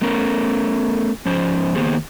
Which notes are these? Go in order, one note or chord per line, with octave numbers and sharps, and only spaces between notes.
A3 B3 C#4 A#4
G#2 F3 C#4 C5
D#3 A#3 B3 G4 G#4 C5